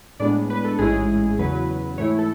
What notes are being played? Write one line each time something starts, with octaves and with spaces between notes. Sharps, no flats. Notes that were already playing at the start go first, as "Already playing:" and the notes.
A2 G#3 B3 D4 D5
B4
A4
A1 G#2 G#3 C#4 E4 G#4
E2 C#3 F#3 B4
G#2 E3 A3 E4 C#5
A4